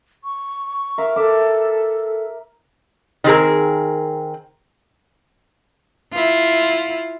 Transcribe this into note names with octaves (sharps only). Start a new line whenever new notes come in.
C#6
A#4 E5 F5
A4 E5 D6
D#3 C4 G#4 A#4
E4 F4